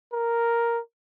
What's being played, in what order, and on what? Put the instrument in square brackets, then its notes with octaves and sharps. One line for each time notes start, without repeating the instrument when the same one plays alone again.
[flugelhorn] A#4